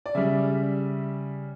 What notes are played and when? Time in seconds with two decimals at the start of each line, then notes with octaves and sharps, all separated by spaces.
0.06 D5
0.15 C#3 G3 E5